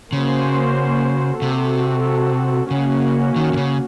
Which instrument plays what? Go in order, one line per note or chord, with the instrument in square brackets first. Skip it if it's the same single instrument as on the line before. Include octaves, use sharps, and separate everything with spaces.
[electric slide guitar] C#3 [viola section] A#3 C#4 F#4 C5
[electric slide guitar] C3 [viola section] C4 F#4 A4
[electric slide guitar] C#3 [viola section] A#3 C#4 F#4
[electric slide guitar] D#3
D#3
C#3